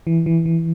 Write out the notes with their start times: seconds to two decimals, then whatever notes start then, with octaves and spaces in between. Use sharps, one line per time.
0.07 E3
0.26 E3
0.46 E3